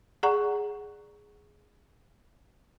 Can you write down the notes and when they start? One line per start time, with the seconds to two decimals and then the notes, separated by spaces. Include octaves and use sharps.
0.23 G#4 D5 F#5 A#5 C#6